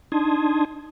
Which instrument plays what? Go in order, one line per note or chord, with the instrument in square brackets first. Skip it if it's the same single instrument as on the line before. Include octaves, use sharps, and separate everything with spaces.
[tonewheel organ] D4 D#4 A5 C6 D#6 G#6